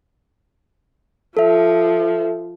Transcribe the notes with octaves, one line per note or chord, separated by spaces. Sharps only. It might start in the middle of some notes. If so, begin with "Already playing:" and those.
F3 A4 E5